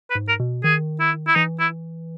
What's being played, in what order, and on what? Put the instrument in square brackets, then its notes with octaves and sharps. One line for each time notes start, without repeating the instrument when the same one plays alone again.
[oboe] B4
[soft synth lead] G#2
[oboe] A#4
[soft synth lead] B2
[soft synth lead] D#3 [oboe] G#4
[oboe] E4
E4
[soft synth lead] E3 [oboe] D#4
[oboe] E4